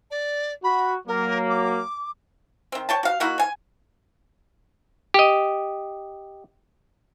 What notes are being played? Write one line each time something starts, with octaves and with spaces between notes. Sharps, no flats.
D5
F#4 B5
F#3 A#3 A#4
D6
D#3 C4
C#5 G5 A5
F#4 F5
A#3 D#4 E4 F#4
G#5
G4 D#5